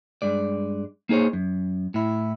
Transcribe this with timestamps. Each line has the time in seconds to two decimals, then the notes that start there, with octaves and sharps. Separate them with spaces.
0.22 G2 G#3 D5
1.09 A#3 D#4 G#4 C5 C#5
1.33 F#2
1.94 A2 E4